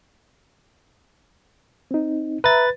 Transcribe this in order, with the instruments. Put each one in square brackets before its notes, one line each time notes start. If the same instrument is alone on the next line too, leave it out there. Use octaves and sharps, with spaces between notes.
[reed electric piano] C4 D#4
[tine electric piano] B4 A6 [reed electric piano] E5 A#5